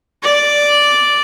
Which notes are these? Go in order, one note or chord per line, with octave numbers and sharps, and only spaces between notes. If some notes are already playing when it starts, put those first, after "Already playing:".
D5